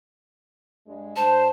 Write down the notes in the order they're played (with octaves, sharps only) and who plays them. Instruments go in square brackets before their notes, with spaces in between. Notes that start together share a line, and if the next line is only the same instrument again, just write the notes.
[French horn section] G2 G#3
[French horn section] G2 C5 [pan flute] A5